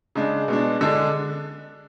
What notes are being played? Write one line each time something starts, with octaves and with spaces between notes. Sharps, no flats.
C#3 G#3 D4
B2 G#3 D4
D3 G#3 D4